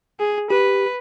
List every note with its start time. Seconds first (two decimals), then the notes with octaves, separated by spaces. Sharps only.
0.20 G#4
0.50 G4 B4